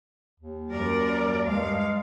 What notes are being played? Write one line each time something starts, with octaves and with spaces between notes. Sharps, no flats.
D#2
F#2 A#4 D5
G2 G#3 F5